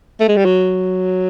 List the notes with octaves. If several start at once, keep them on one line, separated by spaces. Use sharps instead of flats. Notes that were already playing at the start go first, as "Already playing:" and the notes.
A3
G#3
G3
F#3